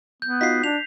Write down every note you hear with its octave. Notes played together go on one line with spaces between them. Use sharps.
B3 G6
D#4 F4 F#4 B6 C7
D4 F7